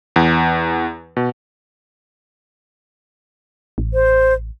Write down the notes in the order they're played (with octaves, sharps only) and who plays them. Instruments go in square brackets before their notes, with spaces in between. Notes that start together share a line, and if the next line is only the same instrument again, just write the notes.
[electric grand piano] E2
B2
[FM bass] A1
[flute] C5